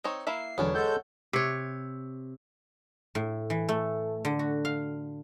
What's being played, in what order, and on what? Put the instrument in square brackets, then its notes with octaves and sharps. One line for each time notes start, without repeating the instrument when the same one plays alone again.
[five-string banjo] C4 D#4 C#5
[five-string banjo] A#3 E4 E5 [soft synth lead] C7
[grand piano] E1 D3 F#3 [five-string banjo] B3 C#4 D4 [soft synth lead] C#5
[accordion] G#3 A4 G6 [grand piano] F#5
[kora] C3 C#5
[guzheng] A2
E3
A3
D3
F#4
F5